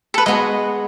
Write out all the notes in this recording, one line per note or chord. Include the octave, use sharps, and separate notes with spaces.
A4 B4
G#3 B3 F#4 D#5